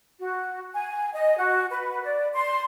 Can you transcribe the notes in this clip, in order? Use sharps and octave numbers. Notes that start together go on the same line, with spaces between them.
F#4
G#5
D#5
F#4
B4
D5
C6